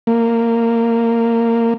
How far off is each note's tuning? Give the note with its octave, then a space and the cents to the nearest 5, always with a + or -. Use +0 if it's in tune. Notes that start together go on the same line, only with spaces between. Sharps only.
A#3 -15